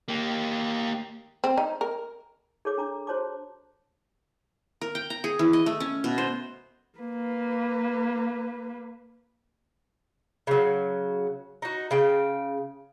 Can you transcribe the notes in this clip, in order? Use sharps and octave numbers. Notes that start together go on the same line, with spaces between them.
A#3 G4
C4
D#4
A#4
G#4 A4 C#5 D6
D4 A#5 D6
F#4 C5 C#5 A5 D6
A#4
G5
A#5
G#4
E3
D#5
A3
C#4
B2
C5
A#3 B4
C#3 F#3
D#4 F#4
C#3 G5